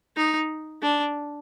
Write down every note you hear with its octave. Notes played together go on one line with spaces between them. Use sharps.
D#4
D4